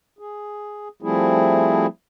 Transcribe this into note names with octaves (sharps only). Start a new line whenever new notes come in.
G#4
F3 G3 A3 C4 E4 G#4